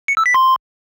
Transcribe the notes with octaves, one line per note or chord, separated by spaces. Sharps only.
C#7
E6
B6
C6